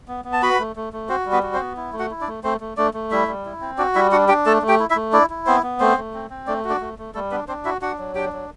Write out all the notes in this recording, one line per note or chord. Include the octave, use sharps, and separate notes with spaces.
B3
B3
A5
F#4 B4 B5
A3
A3
A3
C4 F#4 C5
G3
B3 B4
F#4
C4 C5
B3
E4
A3
F#4 F#5
E4
D4 D5
A3
A3 C4 C5
A3
A3 D4 D5
A3
G3 E4 E5
G3
E4
C4
D4 F#4 D5
G3 E4 E5
D4 F#4 F#5
D4 G4 G5
A3 A4 A5
A3
G4 G5
E4
E4 E5
A3
D4 E4 D5
E4
B3 C4 C5
B3
A3 C4 C5
A3
C4
C4
A3 D4 D5
F#4
D4 D5
A3
A3
G3 A3 A4
B3 D4 B4
C4 D4 C5
E4 F#4 E5
D4 F#4 F#5
F#3
D4 G4 G5
F#3